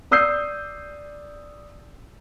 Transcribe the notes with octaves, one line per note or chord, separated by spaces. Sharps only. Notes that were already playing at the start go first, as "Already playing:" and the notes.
D5 D#6 E6 G6 C7